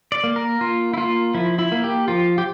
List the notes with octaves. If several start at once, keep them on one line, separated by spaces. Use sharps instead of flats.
D5
A#3
A#4
A#3 F4
E4
A#3 F4
F3 E4
E4
A#3
G4
F3 F4
G4